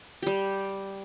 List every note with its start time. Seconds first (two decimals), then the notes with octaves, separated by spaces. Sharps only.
0.22 G3 G4